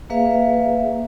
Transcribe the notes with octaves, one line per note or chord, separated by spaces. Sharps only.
A#3 G#4 B4 E5 F5